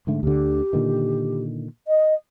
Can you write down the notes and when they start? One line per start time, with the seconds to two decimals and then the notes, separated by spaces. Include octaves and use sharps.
0.07 G#2 D3 A3
0.23 D2 D3 G4
0.73 A#2 D3 D#3
1.87 D#5